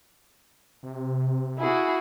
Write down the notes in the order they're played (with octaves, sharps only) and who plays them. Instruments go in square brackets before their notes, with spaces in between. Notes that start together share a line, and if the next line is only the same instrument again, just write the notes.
[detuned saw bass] C3
[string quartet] E4 F#4 G#4